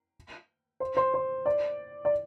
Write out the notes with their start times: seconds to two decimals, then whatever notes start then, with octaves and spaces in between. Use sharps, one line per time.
0.80 C5
0.97 C5
1.14 C5
1.46 D5
2.05 D5